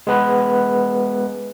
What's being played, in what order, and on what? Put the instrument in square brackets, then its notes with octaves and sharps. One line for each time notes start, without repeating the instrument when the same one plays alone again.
[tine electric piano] G#3 B3 B4